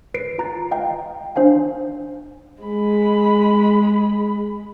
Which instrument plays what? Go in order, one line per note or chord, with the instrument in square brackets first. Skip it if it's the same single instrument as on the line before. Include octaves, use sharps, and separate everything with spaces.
[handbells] B4 C7 D7
F4 A#5 F#6 A6
D#5 F5 G5 A#5
D4 C5 F5 G#5
[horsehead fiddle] G#3 B5